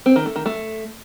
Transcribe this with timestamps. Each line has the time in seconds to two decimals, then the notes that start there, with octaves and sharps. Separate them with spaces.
0.06 C4
0.16 D#3
0.26 A3
0.36 D#3
0.46 A3